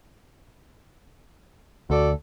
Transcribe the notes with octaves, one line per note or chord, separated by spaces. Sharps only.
D2 F#4 A4 D5